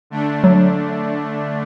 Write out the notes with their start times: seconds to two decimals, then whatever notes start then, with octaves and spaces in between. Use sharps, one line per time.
0.10 D3 A3 D4
0.44 F#3